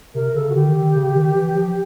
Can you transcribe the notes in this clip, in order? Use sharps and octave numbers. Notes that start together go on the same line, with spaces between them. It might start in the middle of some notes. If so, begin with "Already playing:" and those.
C3 A#4
C#3 A4
F#4
D3 G4
D#3
D#3
C#3
D#3
E3
F3